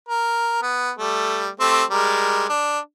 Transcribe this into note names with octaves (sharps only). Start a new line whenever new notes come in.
A#4
B3
G3 A3
A3 C4 G4
G3 G#3 A#4
D4